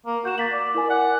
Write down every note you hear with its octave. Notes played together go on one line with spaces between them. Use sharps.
A#3
F#4 G6 E7
A#3 A6 B6 F#7
D5
E4 A#4 G#5
F#5